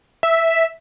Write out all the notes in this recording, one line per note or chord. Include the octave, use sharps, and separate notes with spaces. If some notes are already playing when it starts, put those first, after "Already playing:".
E5